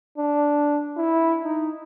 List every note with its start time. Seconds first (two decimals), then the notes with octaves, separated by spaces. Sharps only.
0.18 D4
0.97 E4
1.45 D#4